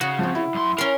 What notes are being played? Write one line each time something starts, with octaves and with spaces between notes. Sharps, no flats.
C#3 F#4
F3 C4
E4
F#2 C6
C#4 A#4 C6